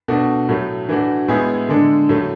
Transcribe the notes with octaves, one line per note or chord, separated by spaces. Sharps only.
B2 A3 D4 F#4
A2 F#3 A3
E3 A3 D4 F#4
A2 G#3 B3 E4 G#4
D3 G#3 D4 A4
A2 F#3 A3